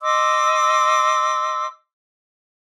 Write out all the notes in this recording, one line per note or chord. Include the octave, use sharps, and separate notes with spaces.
D#5 C6 D6 E6